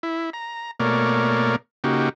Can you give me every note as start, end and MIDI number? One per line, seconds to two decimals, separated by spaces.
0.03 0.30 64
0.33 0.71 82
0.80 1.56 47
0.80 1.56 57
0.80 1.56 58
0.80 1.56 70
0.80 1.56 73
0.80 1.56 74
1.84 2.09 49
1.84 2.09 58
1.84 2.09 63
1.84 2.09 66
1.84 2.09 67